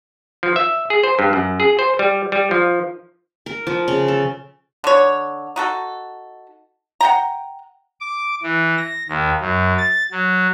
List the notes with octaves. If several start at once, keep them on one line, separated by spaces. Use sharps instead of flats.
F3
E5
G#4
C5
G2
F#2
G#4
C5
G3
G3
F3
A#4
F3
C#3
A4
D3 C#5
D#4 F#4 A4
F#5 G5 A#5
D6
E3
A#6
D#2
F#2
A6
F#3